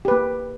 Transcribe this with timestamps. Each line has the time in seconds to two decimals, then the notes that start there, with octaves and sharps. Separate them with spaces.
0.05 G4
0.08 B4
0.11 A#3